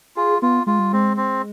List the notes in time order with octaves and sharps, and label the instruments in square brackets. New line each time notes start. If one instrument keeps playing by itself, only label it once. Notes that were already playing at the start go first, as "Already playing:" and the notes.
[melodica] F4 [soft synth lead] G#4
[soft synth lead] B3 [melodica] F4
[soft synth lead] G#3 [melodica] F4
[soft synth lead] G3
[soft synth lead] G#3 [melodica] C4
[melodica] C4